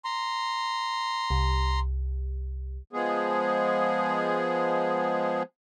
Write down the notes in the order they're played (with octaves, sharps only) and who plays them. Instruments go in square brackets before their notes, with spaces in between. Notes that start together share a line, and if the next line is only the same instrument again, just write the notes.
[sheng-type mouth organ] A#5 C6
[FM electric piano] C2
[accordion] F3 G#3 B3 G#4